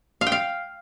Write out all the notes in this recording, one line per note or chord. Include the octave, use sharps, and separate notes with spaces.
F5
G5
F5